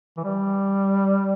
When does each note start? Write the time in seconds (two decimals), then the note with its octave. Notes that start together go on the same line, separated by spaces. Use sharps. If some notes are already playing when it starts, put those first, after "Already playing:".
0.17 E3
0.24 G3